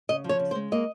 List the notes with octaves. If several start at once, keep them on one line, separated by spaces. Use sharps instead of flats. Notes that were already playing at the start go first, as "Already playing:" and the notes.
C#3 D#5
F3
C#5
C#3
C5
G#3
A#3 D#5